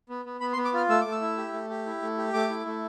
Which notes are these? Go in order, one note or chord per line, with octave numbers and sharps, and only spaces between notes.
B3
B3
B3 B5
C6
B3
D6
F4 F6
A3 E6
A3 D6
E6
E4
G4
A3
G4
E4
A3
G4
A3 D6
E4
A3